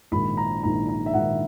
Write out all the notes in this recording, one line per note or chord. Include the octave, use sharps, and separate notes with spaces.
A#1 G#2 D#3 B5
A#5
A#1 G#2 D#3 A#5
A#5
E5
A#1 G#2 D#3 F#5